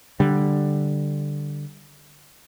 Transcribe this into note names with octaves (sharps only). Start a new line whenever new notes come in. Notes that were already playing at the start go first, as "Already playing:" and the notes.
D3 G3